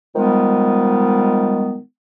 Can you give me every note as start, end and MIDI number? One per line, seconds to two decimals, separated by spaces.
0.16 1.78 51
0.16 1.78 53
0.16 1.78 55
0.16 1.78 56
0.16 1.78 59